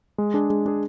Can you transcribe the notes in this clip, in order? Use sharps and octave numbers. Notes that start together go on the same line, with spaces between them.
G#3
D4 G#4
G#3
D4 G#4